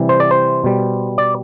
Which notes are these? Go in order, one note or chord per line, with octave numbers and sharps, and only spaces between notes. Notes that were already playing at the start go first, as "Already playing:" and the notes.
Already playing: C3 E3 G3
C5
D5
C5
B2 G3
D5